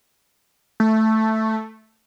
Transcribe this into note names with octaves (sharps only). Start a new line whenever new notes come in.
A3